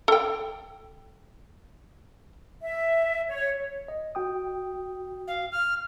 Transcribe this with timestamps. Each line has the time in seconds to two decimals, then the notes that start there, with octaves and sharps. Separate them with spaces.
0.08 A4 G5
2.62 E5
3.28 C#5
3.88 D#5
4.15 F#4 G5 D#6
5.28 F5
5.52 F6